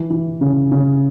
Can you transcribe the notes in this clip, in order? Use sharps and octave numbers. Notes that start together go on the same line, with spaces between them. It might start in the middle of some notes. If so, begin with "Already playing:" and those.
Already playing: E3
E3
C#3
C#3